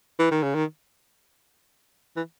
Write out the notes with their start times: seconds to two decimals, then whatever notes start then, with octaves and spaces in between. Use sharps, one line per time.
0.19 E3
0.31 D#3
0.43 C#3
0.55 D#3
2.16 E3